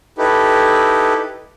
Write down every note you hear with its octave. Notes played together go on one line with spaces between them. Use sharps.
D#4 E4 G4 A4 B4